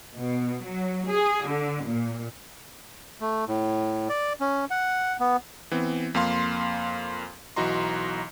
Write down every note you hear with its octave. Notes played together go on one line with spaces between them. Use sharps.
B2
F#3
G#4
D3
A#2
A3
A2
D5
C#4
F#5
B3
E3 B3 C4
F2 A#3 F5 C6
B1 E3 F#4 D#5 A#5 C6